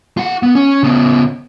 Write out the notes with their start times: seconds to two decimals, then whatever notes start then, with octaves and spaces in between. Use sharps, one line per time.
0.17 F4 F#5
0.43 B3
0.55 C#4
0.83 C#3 B3